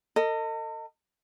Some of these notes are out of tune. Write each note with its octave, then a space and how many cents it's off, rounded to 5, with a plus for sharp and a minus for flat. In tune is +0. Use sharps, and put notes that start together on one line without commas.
A4 +45 D#5 +0